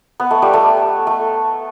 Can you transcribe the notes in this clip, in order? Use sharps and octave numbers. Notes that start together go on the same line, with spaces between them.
B3
A3
G3
A3
A3